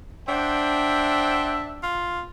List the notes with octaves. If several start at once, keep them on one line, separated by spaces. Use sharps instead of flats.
D4 C5 E5 F#5 G5
F4